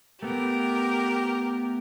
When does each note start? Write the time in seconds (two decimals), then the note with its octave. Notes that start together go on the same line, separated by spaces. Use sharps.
0.23 A3 B3 G4 A#4